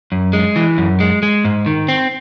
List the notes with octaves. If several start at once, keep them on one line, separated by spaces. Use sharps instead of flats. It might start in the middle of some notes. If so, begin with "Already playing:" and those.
F#2
G#3
E3
F#2
G#3
G#3
G#2
D#3
C4